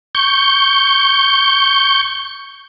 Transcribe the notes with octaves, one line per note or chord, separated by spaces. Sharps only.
C#6 G6